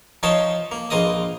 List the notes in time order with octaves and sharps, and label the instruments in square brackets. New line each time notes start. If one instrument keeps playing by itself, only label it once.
[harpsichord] F3 D#4 A#4 C#5 A5 C6
A#3
A#1 A#3 F4 A#4 D#5 D#6